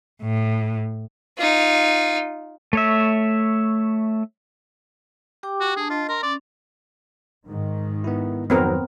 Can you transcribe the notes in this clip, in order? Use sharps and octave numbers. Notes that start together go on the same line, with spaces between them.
A2
D#4 F4
A3 C#5 E5
G4 G5 D6
F#4
D4 G#4 A5
F4 D#5
A#4 C6
C#4 D5
G#2 D#3
B3 E4
F2 D#3 F#3 B3 C4 A#4